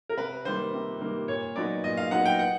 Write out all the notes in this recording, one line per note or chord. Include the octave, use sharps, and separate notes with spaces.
A#4
C3 B4
D#3 G3 A#3 C5
C3
D#3 G3 A#3
A#2 C#5
F#3 B3 D#4 D5
A#2 D#5
F5
F#3 B3 D#4 F#5
G5
F#5